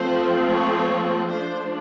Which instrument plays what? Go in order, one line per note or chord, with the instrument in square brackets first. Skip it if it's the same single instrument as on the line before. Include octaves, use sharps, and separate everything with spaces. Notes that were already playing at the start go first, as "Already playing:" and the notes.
Already playing: [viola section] F3 A3 C4 C5
C#5
F3 A3 D4 C5